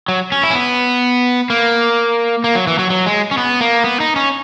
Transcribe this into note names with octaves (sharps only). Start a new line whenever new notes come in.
F#3
C#4
E4
C#4
B3
A#3
A#3
F#3
E3
F#3
F#3
G#3
C#4
B3
A#3
B3
D#4
C#4